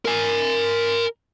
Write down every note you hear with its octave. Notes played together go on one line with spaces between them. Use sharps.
A#4 G#5